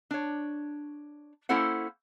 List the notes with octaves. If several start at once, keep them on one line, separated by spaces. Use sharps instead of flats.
D4 C#5
A#3 C#4 E4 A4 C5 F#5